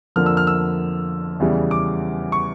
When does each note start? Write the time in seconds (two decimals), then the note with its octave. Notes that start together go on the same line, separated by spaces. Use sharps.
0.16 F2 D3 F3 A#3 F6
0.26 E6
0.37 F6
0.47 E6
1.40 E2 C#3 E3 G3
1.71 D6
2.32 C#6